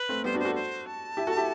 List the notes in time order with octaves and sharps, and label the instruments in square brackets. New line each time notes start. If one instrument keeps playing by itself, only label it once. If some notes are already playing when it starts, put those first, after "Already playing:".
Already playing: [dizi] B4
[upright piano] A3 C4
[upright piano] G3 B3 [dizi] C5
[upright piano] D4 F#4
[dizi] C5
[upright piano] F#4 A4
[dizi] C5
A5
[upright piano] E4 G4
F#4 A4
E4 G4